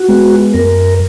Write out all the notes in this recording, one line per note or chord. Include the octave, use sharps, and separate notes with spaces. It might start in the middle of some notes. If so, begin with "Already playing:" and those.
Already playing: F#4
G#3 B3
F#2 A#4